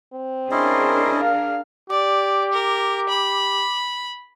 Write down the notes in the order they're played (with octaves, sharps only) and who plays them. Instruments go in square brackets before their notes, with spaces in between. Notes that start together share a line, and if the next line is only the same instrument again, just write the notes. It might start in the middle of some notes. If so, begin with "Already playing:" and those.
[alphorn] C4
[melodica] C#4 E4 D#5 [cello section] D4 G#4 A#4 [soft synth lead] C6
[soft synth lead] F5
[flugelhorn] G4 [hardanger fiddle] D5 [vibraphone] D6
[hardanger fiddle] A#4
B5